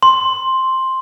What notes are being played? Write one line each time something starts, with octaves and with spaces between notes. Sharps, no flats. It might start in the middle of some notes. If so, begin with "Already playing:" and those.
C6